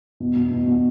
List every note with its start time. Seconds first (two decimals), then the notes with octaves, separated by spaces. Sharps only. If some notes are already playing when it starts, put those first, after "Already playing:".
0.20 B2
0.36 B2
0.51 B2
0.67 B2